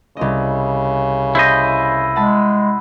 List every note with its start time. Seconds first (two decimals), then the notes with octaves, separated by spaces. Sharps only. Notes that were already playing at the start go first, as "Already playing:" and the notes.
0.17 C2 C#3 C4 D#5
1.35 E4 C5 D#5 E6 G6
2.16 G#3 F#5 A5 B5